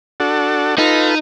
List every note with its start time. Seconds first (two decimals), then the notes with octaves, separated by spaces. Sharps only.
0.20 D4 F#4 A4
0.79 D#4 F4 A4 B4